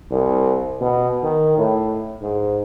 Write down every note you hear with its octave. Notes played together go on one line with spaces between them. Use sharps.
C2
B2
D#3
A2
G#2